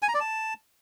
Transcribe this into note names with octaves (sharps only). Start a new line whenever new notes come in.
G#5
A#5
D5
A5